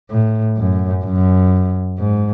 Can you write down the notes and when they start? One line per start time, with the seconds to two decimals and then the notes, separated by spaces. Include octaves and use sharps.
0.10 A2
0.57 F#2
1.04 F#2
1.98 G#2